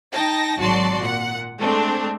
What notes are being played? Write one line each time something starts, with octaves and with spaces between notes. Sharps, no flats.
D#4 G5 A5 A#6
G#1 F#3 F#4 D5 A5 C6
A#2 F#5
G#3 A3 C4 D4